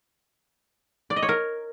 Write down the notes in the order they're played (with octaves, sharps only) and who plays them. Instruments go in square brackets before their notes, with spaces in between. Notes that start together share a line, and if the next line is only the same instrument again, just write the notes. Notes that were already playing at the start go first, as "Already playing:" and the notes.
[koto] D5
D#5
C#5
A#4